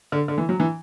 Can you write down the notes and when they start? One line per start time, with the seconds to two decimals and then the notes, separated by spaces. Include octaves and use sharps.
0.12 D3
0.28 D3
0.38 E3
0.49 F#3
0.60 E3